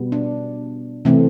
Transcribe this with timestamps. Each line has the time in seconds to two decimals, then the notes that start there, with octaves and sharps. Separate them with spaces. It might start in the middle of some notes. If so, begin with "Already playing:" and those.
Already playing: B2 G3 B3
0.12 D4
1.05 C3 E3 A3 C4